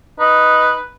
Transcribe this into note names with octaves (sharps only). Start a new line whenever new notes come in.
D#4 B4